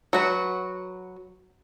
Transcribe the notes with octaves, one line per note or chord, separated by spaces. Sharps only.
F#3 F#4 B4